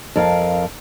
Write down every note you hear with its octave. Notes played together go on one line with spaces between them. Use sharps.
F2 A#4 F5